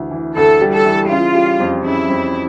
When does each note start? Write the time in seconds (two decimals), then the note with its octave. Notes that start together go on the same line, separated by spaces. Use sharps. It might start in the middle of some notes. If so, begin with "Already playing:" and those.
Already playing: D2 E3
0.11 E3
0.36 D2 A4
0.61 G3
0.73 A4
0.85 E3
1.10 C#3 F4
1.35 G3
1.59 F2
1.84 C#3 E4
2.09 F2